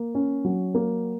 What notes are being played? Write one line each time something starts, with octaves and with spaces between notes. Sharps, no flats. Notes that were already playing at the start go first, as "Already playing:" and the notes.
Already playing: A#3
C#4
F#3
A#3